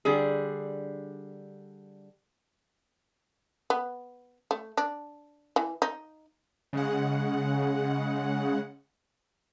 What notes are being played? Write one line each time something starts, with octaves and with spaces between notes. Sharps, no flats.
D3 G3 G#4
B3
A3
D4
E3
D#4
C#3 G#3 F#5